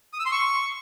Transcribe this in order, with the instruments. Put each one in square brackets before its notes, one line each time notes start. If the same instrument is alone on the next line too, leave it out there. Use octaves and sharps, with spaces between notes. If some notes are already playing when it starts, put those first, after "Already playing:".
[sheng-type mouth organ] D#6
E6
C6
C#6